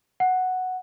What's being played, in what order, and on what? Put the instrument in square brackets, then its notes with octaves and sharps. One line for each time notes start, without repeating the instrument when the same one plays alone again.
[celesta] F#5